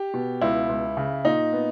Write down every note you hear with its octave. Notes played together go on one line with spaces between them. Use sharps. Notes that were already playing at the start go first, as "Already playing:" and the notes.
Already playing: G4
B2
C#2 E4
C#2
C#3
A#2 D#4
B3